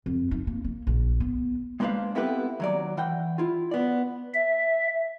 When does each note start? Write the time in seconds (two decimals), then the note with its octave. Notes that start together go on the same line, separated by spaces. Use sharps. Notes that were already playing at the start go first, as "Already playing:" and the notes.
0.06 F2
0.31 D#4
0.47 A#3
0.64 A#3
0.87 A#1
1.20 B3
1.80 G#3 A#3 D4 B4 C5 F5
2.15 B3 C4 E4 G4 A4 B4
2.60 D#2 F#3 D5
2.97 E3 F#5 G5
3.38 E4 F4
3.71 B3 D5
4.34 E5